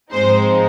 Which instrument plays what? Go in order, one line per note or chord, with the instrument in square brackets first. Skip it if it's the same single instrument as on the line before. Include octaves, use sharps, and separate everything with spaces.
[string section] G#2 F3 G#3 C4 D#4 C5